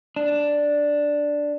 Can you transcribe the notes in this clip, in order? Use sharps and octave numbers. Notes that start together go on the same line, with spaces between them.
D4